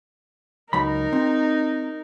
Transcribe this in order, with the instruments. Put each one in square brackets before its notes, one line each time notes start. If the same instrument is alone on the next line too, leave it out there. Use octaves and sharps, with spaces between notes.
[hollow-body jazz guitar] C#2 F#3 B5 [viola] D#4 A#4
[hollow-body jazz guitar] C4